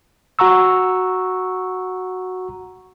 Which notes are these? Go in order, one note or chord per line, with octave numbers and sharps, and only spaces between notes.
F#4 F#5 A#5 C#6 E6